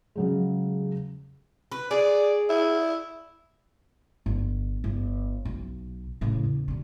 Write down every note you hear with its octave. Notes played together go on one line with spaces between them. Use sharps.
C#3 F#3 G#3
B4
G#4 D5
E4
G1
G1
B1
A2 C#3
E2
B2 D3